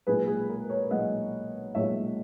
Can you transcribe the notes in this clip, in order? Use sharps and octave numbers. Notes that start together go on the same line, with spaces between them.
B1 A#2 G#3 G#4 B4
G#4
A#4
A#4 C#5
B1 A#2 G#3 D#5 F#5
B1 A#2 G#3 C#5 E5